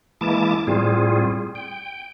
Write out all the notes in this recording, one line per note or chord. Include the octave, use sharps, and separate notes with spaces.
E3 G#3 A#3 E4 A5 D6
A2 G3 C4 F4 G#4
G5